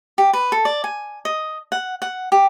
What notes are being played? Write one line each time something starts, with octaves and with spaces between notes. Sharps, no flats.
G4
B4
A4
D5
G#5
D#5
F#5
F#5
G4